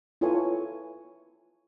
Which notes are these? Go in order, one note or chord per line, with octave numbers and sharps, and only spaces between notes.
E4 F4 A4 B4 C#5 G#5